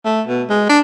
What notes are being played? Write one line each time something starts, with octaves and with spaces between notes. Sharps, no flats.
A3
B2
G#3
D4